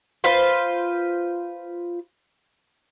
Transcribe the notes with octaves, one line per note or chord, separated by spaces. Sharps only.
F4 B4 C5